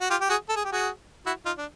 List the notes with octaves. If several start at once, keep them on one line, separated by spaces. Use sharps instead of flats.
F#4
F4 G4
G4
F#4 G#4
A4
G#4
G4
F#4 G#4
E4 F#4
D#4 F4
D4